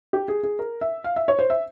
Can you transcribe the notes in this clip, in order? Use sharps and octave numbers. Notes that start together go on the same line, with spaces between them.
G4
G#4
G#4
A#4
E5
F5
E5
C#5
C5
E5